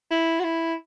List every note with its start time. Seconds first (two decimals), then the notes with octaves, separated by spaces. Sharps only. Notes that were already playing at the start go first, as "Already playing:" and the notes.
0.11 E4
0.40 F#4
0.44 E4